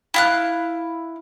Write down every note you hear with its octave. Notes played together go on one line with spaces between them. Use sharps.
E4 F5 F#6